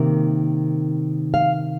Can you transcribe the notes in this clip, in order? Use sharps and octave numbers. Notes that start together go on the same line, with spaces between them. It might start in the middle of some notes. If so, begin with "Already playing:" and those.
Already playing: C3 D#3 A#3
F5